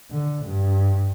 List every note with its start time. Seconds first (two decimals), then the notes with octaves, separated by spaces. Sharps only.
0.11 D3
0.45 G2